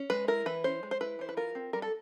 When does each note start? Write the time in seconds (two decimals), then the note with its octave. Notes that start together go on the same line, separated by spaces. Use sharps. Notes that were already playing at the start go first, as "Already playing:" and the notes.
Already playing: C#4
0.10 G#3 B4
0.28 E4 A#4
0.46 E3 B4
0.64 C#4 C5
0.83 G#3
0.91 C5
1.01 E4 B4
1.19 E3 C5
1.29 B4
1.37 F4 A#4
1.55 C4
1.73 G3 A#4
1.82 A4